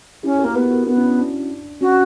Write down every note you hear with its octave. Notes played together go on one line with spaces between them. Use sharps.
C#4 E4 G4
F#4 A#4
A#3
B3 G4 B4
F#4 A#4
B3 D4 F#4
C#4 E4
D4
D4
C#4 F#4